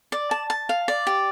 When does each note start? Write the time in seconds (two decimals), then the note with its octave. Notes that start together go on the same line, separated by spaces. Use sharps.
0.12 D5
0.31 A5
0.50 A5
0.69 F5
0.88 D5
1.07 G4